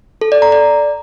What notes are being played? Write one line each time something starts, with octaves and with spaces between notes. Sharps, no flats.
A4
D5
A#5
D5